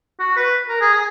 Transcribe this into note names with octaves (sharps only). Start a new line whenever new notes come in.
F#4
B4
A#4
G#4
G#4